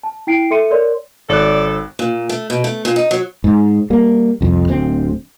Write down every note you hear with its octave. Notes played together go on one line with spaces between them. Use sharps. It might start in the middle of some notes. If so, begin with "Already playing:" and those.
A5
E4 G5 C7 D7
A4 E5 C6 C#7 D#7
A#4 C#5 D5 C6
G#1 A4 C#5 D5 F#6
A#2
A3
B2
A3
A#2
D#4
F#3
G#2
G3 A#3
C2 F2
D1 D2 C4